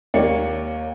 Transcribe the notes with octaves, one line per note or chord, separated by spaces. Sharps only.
D#2 A#3 C#5 D5 C#7